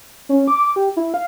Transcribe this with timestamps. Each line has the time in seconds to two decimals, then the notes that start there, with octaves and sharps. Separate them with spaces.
0.29 C#4
0.48 D6
0.76 G4
0.97 E4
1.14 F5